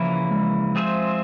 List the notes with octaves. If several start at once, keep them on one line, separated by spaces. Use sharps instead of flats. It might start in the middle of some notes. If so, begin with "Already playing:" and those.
Already playing: C#3 E3 F3 A#3 E4
G#3
C4 F4 G#4 C5 E5